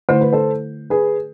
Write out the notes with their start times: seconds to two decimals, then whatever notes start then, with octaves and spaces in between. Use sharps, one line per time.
0.09 D3 A3 E4 C5
0.21 B4
0.33 A4 C5
0.90 G#4 B4